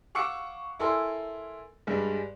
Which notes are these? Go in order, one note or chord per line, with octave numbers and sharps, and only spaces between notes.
F5 F#5 C#6 D6 E6 C#7
E4 A4 A#4 G#5 C6
G2 G3 G#3